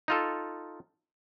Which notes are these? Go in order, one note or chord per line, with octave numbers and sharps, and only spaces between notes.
D#4 F4 A4